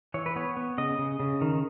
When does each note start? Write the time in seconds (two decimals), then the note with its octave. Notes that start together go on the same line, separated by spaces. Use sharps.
0.14 E3 C#5
0.26 B4
0.36 B3 C#5
0.57 B3
0.78 C#3 D#5
0.99 C#3
1.20 C#3
1.42 D#3